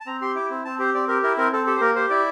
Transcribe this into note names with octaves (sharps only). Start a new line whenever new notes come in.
A5
C4 A#5
G4 C6
E4 D6
C4
C4 A5
G4 C5
C4 D5
G4 A#4
E4 A#4
C4 A#4
C4 A4
G4 A4
C5
A#3 A#4
G4 C5
E4 D5